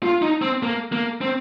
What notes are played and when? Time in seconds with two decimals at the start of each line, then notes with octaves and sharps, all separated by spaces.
0.03 F4
0.22 D#4
0.42 C4
0.63 A#3
0.92 A#3
1.21 C4